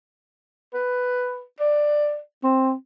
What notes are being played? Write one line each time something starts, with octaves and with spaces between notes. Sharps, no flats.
B4
D5
C4